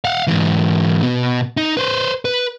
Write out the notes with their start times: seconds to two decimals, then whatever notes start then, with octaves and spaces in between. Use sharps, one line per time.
0.05 F5 F#5
0.27 G#2 E3
1.03 B2
1.57 D#4
1.77 B4 C5
2.25 B4